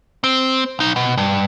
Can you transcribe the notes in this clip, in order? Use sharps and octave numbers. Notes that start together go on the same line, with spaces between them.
C4
B1 D#4
B2
G2